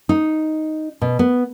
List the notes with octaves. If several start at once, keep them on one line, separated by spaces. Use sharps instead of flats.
D#4
B2
B3